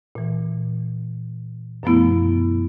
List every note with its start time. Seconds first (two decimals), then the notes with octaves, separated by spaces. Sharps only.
0.15 A#2 E3
1.83 F#2 B2 F3 A3 B3 E4